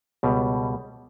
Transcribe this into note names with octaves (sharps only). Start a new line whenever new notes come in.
C#2 B2 G3